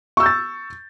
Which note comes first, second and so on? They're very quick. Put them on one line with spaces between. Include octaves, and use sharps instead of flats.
C#6 E6 G6 A6